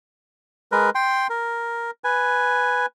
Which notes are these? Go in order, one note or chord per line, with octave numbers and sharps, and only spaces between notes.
G#3 A#4 B4
G5 C6
A#4
B4 G#5